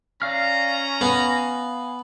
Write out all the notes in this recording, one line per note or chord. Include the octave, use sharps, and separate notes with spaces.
C#4 D5 F5 A#5 F6
B3 F5 G#5